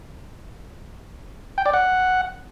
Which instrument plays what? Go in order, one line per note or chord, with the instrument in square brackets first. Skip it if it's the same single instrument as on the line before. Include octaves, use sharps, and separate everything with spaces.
[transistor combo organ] G5
D5
F#5